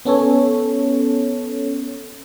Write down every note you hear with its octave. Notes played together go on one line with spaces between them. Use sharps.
B3 C#4 A4 C#5